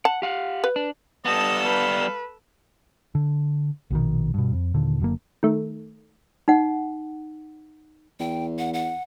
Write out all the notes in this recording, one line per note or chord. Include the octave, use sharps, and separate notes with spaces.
F#5 A5
G4 F5 F#5
B4
D4
G3 B3 A4 D#5 A5
B4 F5
D3
A#1 B2 D#3
G2 B2
F2
D#2 A#2 D3
F#1 F#2 D3 A#3
D#3 A3
D#4 F#5
E2 G5
F#5
F#5